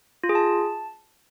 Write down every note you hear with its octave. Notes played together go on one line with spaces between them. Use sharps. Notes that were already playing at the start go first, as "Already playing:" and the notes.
F4
G#4
A5